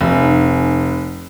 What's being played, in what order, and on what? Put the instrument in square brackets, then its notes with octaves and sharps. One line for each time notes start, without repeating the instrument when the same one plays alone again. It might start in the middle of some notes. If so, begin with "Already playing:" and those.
[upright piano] F1